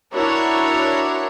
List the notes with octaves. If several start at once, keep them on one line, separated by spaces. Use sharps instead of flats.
D4 E4 F#4 A#4 C#5